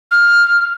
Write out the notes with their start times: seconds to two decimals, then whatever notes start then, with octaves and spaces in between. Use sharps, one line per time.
0.11 F6